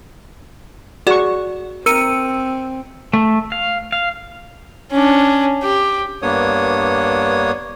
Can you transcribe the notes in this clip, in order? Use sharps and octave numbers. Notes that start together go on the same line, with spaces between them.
F#4 G#4 D5 C#6 E7
C4 A#4 E6 C#7 D#7
A3
F5
F5
C#4 D4
G4
G2 A#3 B3 D4 C#5 D#6